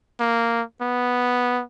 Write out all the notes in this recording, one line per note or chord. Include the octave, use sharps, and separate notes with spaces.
A#3
B3